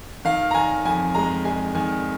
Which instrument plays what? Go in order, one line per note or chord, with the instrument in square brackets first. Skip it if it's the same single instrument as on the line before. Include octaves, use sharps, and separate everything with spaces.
[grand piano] D#3 F5
A#5
D#3 G#5
F2 G#5
G#3 A#5
G#3 G#5
D#3 G#5